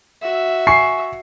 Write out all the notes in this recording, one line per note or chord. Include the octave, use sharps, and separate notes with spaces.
F#4 E5
G#5 C#6 C7